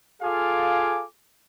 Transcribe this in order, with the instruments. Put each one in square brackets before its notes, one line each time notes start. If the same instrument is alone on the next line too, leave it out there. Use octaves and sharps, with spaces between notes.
[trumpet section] F4 G#4 A4 F5 G#5 D6